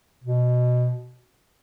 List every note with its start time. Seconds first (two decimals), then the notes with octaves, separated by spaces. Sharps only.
0.24 B2